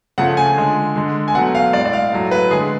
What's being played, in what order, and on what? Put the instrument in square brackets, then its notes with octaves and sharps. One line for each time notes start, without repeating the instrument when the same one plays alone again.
[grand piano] C#3 F3 A3 F#5
G#5
D3 G#3
D3 G#3
G#5
B2 F#3 A3 F#5
F5
G#3 D5
A2
D5
F5
A2 F#3 A3
B4
D3 G#3 G#4